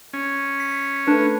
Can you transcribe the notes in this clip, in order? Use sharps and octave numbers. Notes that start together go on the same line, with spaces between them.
C#4
B6
A3 D4 B4